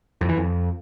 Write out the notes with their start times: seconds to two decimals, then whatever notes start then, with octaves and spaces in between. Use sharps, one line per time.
0.21 F2
0.29 E3
0.37 F2